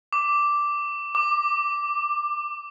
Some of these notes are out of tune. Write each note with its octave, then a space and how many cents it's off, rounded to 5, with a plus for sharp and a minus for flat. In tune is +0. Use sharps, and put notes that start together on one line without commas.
D6 -5
D6 +20